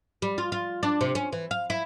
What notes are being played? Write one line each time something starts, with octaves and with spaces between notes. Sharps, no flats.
G3
F4
F4
D4
C3
C#4
E3
F5
E4